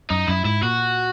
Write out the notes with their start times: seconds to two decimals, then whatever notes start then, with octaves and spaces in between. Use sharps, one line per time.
0.10 F#2 D#4
0.28 F#2 E4
0.45 G#2 E4
0.63 A#2 F#4